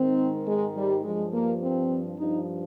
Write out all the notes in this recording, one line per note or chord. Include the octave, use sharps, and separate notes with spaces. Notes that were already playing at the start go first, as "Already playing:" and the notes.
Already playing: G#2 D#3 C4
G#3
G3
G2 F3 G#3
A#3
C4
G2 F3 D#4